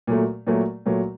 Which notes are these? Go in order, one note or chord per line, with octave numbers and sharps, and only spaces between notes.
A#2 F#3 A3
A#2 F#3 A3
A#2 F#3 A3